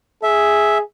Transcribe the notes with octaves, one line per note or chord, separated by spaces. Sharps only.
G#4 E5